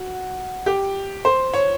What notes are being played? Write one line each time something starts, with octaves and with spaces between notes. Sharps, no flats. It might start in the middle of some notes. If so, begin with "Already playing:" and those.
Already playing: F#4
G4
C5
C#5